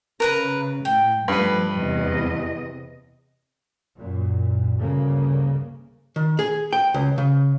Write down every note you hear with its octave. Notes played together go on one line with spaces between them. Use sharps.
C#3 A#4 B4 A#5
A2 G5
G2 F3 A3 B4
E2 C3 D#5
F#2 A#2
D2 G2 C#3 A#3
D#3
G#4
G5
C#2
C#3